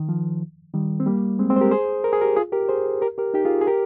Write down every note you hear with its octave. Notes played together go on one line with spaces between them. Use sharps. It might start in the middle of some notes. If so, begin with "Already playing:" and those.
Already playing: D#3
F3
D#3 G3
C4
G3 A#3
G#3 C4
G#3 C4
C5
G4 A#4
G#4 C5
A#4
G#4
G4 A#4
F4 G#4
G4 A#4
G#4 C5
G4 A#4
G4 A#4
D#4 G4
F4 G#4
G#4
G4 A#4